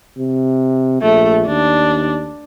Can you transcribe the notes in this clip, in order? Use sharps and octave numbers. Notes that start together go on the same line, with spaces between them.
C3
A#1 A3
D#2 D4